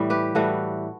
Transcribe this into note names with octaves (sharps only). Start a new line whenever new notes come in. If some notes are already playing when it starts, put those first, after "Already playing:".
Already playing: A2 E3 G3
G4 B4
A2 E3 G3 F#4 A4